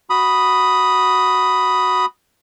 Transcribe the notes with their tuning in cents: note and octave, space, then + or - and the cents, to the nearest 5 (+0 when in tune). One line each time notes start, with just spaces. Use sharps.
F#4 +0 B5 +0 D#6 +0